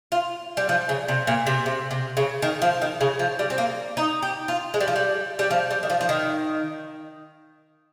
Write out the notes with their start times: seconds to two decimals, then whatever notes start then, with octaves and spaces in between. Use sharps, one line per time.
0.12 F4
0.57 G3
0.69 F3
0.89 C#3
1.08 C3
1.27 A#2
1.47 C3
1.66 C3
1.91 C3
2.17 C#3
2.42 D#3
2.62 F3
2.82 D#3
3.01 C#3
3.19 F3
3.39 G3
3.50 C4
3.58 A#3
3.97 D#4
4.23 G4
4.48 F4
4.74 G#3
4.80 G3
4.88 F3
4.96 G3
5.39 G3
5.51 F3
5.71 G3
5.83 D#3
5.90 F3
6.01 F3
6.09 D#3